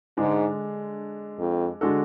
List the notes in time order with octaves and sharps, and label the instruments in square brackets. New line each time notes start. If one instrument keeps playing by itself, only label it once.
[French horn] G#2 [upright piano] D3 G#3 D4
[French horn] F2
[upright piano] D3 G#3 D4 F#4 A4